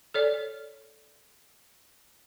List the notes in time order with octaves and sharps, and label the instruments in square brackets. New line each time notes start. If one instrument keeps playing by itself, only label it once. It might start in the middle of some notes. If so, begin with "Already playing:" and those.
[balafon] A4 C#5 D5